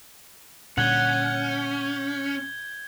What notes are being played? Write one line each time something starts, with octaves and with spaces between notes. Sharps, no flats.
A#2 D3 G3 C#4 F#5 G6 G#6 G7